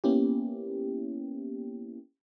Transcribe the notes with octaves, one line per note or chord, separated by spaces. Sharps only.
A#3 B3 C#4 E4 G4